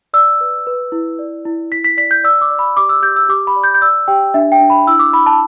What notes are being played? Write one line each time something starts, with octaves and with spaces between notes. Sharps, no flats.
D5 E6
B4
B4
E4
D5
E4
E4 B6
B6
D5 B6
G6
D5 E6
D6
D5
B5
G4 D6
E6
G4 G6
E6
G4 D6
B5
D5
G6
G6
D5 E6
G4 G5
D4 E5
G5
D4
B5
E4 E6
D6
E4 B5
A5